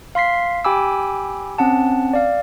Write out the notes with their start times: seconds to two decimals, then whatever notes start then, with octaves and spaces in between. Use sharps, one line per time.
0.15 F5 C6 B6 C7
0.65 G4 G5 G#5 B5 D6 E6
1.58 C4 C#4 F#5 A5
2.13 D5 F5